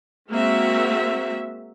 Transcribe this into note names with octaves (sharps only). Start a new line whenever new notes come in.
G#3 A#3 C4 F#4 E5